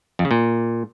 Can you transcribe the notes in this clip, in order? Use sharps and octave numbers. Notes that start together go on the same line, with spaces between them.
F2
C#3
A#2